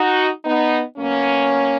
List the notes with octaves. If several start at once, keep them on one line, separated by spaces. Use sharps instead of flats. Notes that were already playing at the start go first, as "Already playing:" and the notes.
Already playing: D#4 F#4
B3 D#4
B2 F#3 A#3 C#4